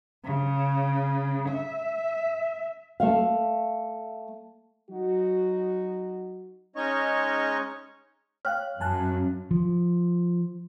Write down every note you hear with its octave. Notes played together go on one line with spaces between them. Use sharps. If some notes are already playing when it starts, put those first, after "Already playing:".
C#3
E5
A3 E5 F5
F#3 D#4 F#4
G#3 C#4 D#4 C#5 D#5 C#6
C#5 F5 G5 F6 F#6
F#2 G#5 A5 F#6
F3